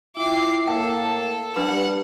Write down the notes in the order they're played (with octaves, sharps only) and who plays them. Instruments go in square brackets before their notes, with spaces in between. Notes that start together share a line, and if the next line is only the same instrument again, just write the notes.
[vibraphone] E4 [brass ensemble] F4 E5 G5 [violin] D6 C7
[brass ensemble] A2 A#3 [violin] A4 [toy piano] G5 [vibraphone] A5
[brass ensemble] G3 [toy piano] D4 B4 B5 [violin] F#5